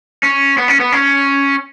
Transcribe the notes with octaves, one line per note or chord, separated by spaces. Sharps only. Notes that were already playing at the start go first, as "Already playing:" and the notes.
C#4
B3
C#4
B3
C#4